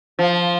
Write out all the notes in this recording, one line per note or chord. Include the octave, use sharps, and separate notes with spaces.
F3